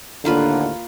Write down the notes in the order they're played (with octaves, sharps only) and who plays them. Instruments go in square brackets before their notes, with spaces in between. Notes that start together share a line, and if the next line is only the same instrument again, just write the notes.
[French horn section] D#2 A2 D3 [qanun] A#3 F4 B4